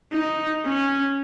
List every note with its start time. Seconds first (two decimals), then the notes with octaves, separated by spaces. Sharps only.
0.12 D#4
0.64 C#4